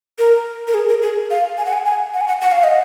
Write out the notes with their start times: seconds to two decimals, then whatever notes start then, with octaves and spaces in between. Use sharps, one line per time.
0.19 A#4
0.68 A#4
0.74 G#4
0.89 A#4
1.02 G#4
1.31 F5
1.58 G#5
1.66 F#5
1.73 G#5
1.85 G#5
2.14 F#5
2.21 G#5
2.28 F#5
2.41 F#5
2.52 F5
2.64 D#5